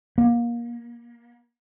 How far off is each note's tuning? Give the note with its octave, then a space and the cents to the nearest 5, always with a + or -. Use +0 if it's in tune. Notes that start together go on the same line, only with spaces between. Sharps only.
A#3 +25